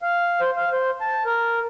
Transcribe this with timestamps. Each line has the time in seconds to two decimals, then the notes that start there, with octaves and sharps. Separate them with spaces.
0.02 F5
0.41 C5
0.57 F5
0.73 C5
1.01 A5
1.25 A#4